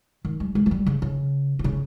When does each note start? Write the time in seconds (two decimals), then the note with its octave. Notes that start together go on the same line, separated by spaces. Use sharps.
0.25 D#3
0.40 G3
0.55 G#3
0.66 F3
0.71 G3
0.86 C#3
1.02 C#3
1.59 C3
1.64 C#3